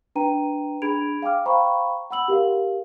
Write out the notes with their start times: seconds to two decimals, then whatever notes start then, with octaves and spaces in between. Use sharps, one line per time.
0.15 D4 B4 G5 A#5 D#7
0.82 D4 G#4 B5 G#6 D7 F7
1.22 F5 G5 G#5 D6 F6
1.45 C5 F5 G5 A#5 B5 C#6
2.11 F#5 B5 E6 F#7
2.28 G4 A#4 F5